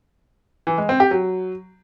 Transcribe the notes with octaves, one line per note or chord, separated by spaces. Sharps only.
E3
G#3
C4
G4
F#3